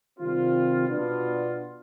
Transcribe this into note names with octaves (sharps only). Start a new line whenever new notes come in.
C3 D#3 G3 C4 F4
B2 B3 D4 F4